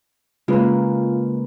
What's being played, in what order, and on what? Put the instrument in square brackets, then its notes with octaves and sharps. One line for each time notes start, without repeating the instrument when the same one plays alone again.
[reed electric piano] C#3 B4 [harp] G#3 A#3 [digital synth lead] F4